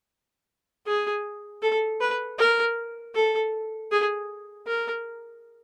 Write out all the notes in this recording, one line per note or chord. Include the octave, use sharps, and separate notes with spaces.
G#4
A4
B4
A#4
A4
G#4
A#4